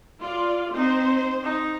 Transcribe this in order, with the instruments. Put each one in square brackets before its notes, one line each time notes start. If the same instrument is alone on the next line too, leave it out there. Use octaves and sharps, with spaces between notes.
[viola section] F4 D5
[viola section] C4 C5 [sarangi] D#4
[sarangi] D#4